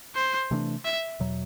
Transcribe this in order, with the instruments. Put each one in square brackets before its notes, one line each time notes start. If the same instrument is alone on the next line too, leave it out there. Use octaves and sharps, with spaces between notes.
[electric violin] C5
[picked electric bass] C3 E3 A3 D4
[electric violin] E5
[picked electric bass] E2 B2 F#3